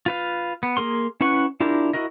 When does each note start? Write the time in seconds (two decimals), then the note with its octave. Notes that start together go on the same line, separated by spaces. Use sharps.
0.06 F4 B4 F5
0.63 B3
0.77 A#3 G#4 A#4 C6
1.21 C#4 E4 B4 F#5 C#6
1.60 D4 E4 F4 G4 A#4
1.93 E4 F#4 A#4 D#5